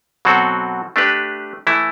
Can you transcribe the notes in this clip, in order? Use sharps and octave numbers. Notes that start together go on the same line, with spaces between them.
B2 F#3 C4 F#4 A4
A3 D4 G4 B4
E3 A3 E4